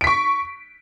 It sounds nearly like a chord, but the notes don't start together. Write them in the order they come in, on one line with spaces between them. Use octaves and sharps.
D7 B6 C#6